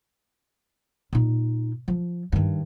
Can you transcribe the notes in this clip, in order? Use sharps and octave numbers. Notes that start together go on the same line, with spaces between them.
A#2 D#4
F3
G2 D#3